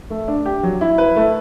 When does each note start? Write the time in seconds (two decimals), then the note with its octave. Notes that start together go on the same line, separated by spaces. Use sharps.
0.10 A3
0.28 D4
0.46 G4
0.63 F#3
0.81 E4
0.98 B4
1.16 A3